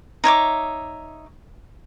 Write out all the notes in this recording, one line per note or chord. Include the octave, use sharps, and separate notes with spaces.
D#4 C#5 E5 D6